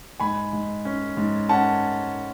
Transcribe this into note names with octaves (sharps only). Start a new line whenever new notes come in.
G#2 G#5 B5
G#2
C#4
G#2
C#4 F#5 A5